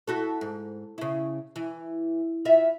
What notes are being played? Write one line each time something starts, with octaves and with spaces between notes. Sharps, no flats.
E4 F#4 A4
G#2
C#3 E4
E3
E4 F4 E5